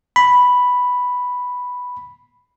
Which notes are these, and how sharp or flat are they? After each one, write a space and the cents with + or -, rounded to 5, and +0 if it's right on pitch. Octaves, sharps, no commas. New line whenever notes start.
B5 +0